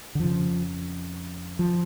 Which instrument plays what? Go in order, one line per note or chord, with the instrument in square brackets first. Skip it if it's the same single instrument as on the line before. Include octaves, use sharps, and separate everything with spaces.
[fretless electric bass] D3
F2 C#3 F3
F3